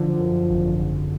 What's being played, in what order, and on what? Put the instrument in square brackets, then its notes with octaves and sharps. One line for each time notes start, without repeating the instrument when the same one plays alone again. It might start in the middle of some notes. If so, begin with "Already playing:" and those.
Already playing: [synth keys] D3 [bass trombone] F3
[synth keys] F#2
G#1
G#1